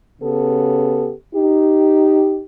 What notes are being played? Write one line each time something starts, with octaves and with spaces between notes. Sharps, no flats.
C#3 B3 G4 A4
D#4 G4